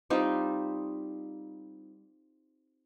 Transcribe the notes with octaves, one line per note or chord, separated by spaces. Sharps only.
G3 C4 D#4 F4